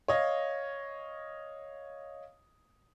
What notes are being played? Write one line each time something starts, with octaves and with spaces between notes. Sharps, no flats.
C#5 D#5 F5